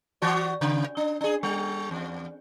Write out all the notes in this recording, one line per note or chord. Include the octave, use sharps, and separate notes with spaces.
E3 F#4 D5
C#3
D4
D4 G#4
G3
E2